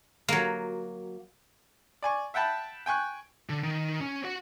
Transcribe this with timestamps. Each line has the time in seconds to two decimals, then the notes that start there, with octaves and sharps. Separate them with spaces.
0.28 F#3 A#3
2.03 D5 G#5 C#6
2.34 E5 F#5 G5 A5 B5
2.86 G5 G#5 C#6 F#6
3.49 D3
3.63 D#3
4.01 C#4
4.24 F#4 F#5